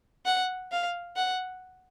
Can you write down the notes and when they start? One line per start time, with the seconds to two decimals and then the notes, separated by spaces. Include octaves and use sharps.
0.26 F#5
0.72 F5
1.16 F#5